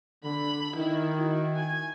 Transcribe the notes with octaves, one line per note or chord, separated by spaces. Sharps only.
D3 B5
D#3 D#4 E4
E4 F#4
G#5